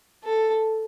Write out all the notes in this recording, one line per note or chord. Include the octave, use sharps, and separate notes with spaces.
A4